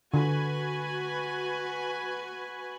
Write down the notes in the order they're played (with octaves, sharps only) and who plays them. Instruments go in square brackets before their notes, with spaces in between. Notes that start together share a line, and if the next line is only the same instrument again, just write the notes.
[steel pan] D3 [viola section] F#4 B4 G#5